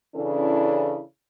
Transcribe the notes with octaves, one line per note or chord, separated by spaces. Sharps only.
C#3 E3 C#4 D4 E4 A4